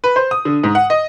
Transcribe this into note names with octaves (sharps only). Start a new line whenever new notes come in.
B4
C5
D#6
D3
G#2
F#5
D#5